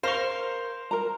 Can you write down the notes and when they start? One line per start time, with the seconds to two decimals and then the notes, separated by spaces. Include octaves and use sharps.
0.03 A#4 C5 F5 C6 C#6
0.91 A#4 A#5